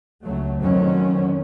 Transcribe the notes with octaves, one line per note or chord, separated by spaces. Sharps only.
C#2 F#3 A3
F2 D3 D#3 F#3 C4 C#4